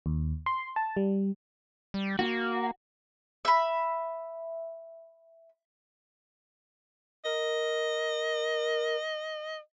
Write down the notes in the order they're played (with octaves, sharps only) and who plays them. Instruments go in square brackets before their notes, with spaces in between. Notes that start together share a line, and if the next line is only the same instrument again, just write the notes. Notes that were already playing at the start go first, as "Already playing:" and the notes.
[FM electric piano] D#2
C6
A5
G3
[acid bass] G3
[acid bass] A#3 [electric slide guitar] F#4
[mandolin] E5 B5
[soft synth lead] A#4 [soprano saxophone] D#5